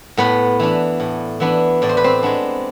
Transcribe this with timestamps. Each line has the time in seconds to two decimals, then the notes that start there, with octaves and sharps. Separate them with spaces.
0.17 A2 B3 B4
0.60 E3 B3 D4
1.00 A2
1.40 E3 B3 D4
1.82 A2 D5
1.89 C5
1.97 B4
2.04 C4 C5
2.23 G#3 B3 D4